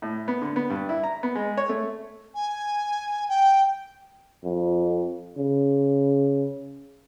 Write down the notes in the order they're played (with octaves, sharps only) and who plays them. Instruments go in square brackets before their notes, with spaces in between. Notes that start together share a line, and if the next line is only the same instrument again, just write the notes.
[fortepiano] A2
B3
D3
B3
G2
E4
A#5
B3
G#3
C#5
A3
[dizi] G#5
G5
[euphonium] F2
C#3